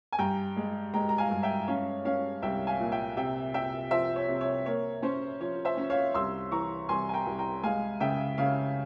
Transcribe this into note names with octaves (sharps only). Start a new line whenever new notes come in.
G#5
G2 G5 A#5
G#3
G#3 G5 A#5
A#5
F5 G#5
G2
E5 G5
C#4 C#5 F5
C#4 C#5 F5
C2 E5 G5
F5 G#5
A#2
E5 G5
C3 E5 G5
C3 E5 G5
F3 C5 E5
C#5
C3
C#5
A#3 C#5
C#4 C5
F3 C#5
C5 E5
C#4
C#5 F5
C2 C6 E6
E3 A#5 C#6
C2 G#5 C6
G#5
G5 A#5
C2
G5 A#5
G#3 F5 G#5
C#3 E5 G5
C#3 C#5 F5